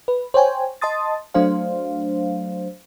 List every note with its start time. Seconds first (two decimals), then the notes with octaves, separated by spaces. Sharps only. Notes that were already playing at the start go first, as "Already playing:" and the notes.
0.08 B4
0.34 C5 C#5 G5 G#5
0.81 D#5 A5 C6 D#6 A6
1.34 F#3 A3 D4 C5 F5